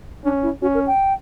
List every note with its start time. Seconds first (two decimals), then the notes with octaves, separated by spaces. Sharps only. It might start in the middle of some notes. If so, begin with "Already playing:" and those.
0.24 C#4 D4
0.43 E4
0.62 C#4 F#4
0.74 A#4
0.87 G5